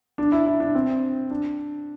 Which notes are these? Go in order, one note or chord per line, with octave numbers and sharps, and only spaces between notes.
D4
E4
E4
D4
C4
D4